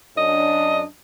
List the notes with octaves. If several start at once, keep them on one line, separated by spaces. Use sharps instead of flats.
F#2 D4 D#5